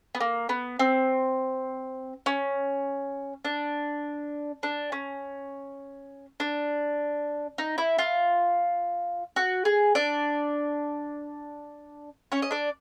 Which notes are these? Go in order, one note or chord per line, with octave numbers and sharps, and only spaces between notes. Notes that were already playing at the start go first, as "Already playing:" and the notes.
B3
A#3
B3
C4
C#4
D4
D4
C#4
D4
D#4
E4
F4
F#4
G#4
D4 D5
C#4 C#5
D#5
D4 D5